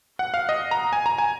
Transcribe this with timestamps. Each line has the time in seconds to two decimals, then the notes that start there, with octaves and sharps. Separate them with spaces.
0.19 F#5
0.34 F5
0.49 D#5
0.71 A#5
0.93 G#5
1.06 A#5
1.18 G#5